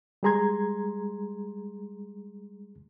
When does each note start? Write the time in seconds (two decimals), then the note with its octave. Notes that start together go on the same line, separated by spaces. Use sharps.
0.23 G3 G#3 G#4 A#5 C6 G#6